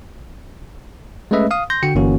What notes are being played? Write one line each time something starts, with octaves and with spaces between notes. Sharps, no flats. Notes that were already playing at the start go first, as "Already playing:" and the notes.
G#3 A3 C#4 B4 D#5 E5
F5 D#6
C6 G6 A#6
D3 F#4 G5 C#7
G1 E3 A#3 C#4 F#4